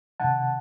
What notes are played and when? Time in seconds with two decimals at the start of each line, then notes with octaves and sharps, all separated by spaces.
0.20 C3 D#3 F#5 A5